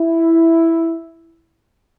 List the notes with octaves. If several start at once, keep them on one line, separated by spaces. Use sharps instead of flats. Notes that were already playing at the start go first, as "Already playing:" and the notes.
Already playing: E4